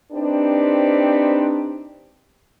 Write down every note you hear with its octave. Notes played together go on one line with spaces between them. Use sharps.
C4 D4 D#4 G4 B4 C5